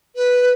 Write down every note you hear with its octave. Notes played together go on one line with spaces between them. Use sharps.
B4